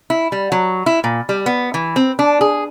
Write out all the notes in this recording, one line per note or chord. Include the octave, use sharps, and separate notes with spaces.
E4
G3
F#3
E4
A#2
G3
B3
E3
C4
D4
G#4